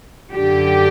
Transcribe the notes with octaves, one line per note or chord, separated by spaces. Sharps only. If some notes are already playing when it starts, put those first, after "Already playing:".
F#2 D3 G4